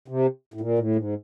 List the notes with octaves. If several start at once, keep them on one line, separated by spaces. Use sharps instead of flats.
C3
A2
A#2
A2
G#2